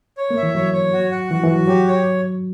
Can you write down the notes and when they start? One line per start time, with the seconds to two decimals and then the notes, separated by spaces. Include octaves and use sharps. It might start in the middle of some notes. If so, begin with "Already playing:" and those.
0.17 C#5
0.31 A#3
0.37 E5
0.43 E3
0.55 F#3 C#5
0.73 C#5
0.93 F#4
1.12 F#5
1.31 E3 F#4
1.44 E3
1.49 F#4
1.55 F#3
1.68 F#3 G4
1.87 C#5